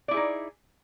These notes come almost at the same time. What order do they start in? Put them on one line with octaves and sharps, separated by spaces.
D5 E4 G#4 D#4